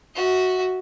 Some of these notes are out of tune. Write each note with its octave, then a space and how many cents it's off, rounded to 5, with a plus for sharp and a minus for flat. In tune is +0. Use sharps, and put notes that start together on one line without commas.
F#4 +0 E5 -30